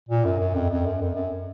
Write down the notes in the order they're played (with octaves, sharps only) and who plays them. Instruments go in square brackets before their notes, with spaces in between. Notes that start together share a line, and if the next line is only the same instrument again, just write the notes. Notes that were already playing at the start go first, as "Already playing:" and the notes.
[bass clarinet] A#2
F#2
F#2
F2
F2
F#2
F2
F#2